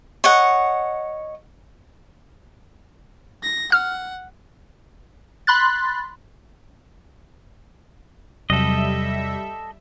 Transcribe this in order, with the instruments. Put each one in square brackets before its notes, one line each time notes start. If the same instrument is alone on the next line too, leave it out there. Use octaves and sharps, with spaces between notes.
[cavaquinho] C#5 D#5 F#5
[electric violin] A#6
[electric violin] F#5 [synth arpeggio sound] F6
[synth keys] B5 C6 F#6 A6
[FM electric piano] E2 C3 F#3 [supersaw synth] G3 E5 [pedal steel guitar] A4 D#5